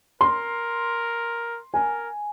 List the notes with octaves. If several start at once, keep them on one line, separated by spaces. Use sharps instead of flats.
A#4 C6
A#4 G#5